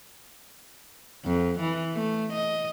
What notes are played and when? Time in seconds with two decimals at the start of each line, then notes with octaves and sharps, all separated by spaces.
1.25 F2
1.60 E3
1.95 A3
2.33 D#5